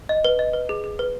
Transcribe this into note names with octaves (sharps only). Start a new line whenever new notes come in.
D#5
B4
D#5
B4
G#4
G#4
B4